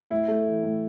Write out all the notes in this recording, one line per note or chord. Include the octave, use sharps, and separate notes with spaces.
A2 E4
A3
E3
A2